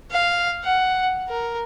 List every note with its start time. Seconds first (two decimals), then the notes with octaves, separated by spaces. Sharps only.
0.11 F5
0.64 F#5
1.29 A#4